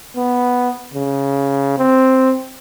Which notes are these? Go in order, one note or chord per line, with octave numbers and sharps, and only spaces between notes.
B3
C#3
C4